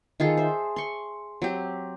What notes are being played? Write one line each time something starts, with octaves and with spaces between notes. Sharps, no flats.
D#3 F4 G#4 A4
C5 E5
C6 C#6
F#3 C4 G4